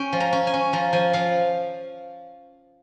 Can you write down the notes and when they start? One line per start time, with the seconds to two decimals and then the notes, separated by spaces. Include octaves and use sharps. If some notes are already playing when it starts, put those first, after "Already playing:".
Already playing: C#4 G5
0.12 F3
0.20 A#5
0.33 C#4
0.47 G#5
0.54 C#4
0.73 F3 A#5
0.93 F3 G#5
1.13 F3 F5